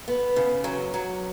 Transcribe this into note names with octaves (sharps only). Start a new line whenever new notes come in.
B3
C#3
F#3
F#3